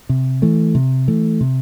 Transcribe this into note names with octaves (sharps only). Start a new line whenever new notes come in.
C3
E3 A3
C3
E3 A3
C3